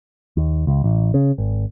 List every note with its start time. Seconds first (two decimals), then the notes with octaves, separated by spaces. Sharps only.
0.37 D#2
0.67 C#2
0.84 A1
1.14 C#3
1.38 G#1